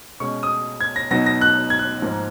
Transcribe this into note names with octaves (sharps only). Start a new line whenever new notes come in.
B2 G#3 C#4 C#6
D#6
G#6
A#6
B2 F#3 B3 D#4 A#6
A#6
F#6
G#6
F#6
G#2 F3 A#3